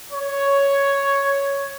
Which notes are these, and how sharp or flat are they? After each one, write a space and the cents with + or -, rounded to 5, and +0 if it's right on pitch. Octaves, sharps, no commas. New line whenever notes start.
C#5 +5